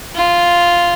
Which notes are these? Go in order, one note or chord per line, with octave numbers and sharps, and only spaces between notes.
F4